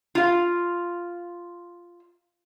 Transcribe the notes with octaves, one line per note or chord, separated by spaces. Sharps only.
F4 F5